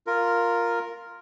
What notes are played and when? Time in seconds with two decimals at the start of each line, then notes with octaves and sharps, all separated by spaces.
0.07 F4 A#4